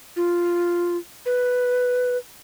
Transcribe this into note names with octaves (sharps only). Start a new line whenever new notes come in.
F4
B4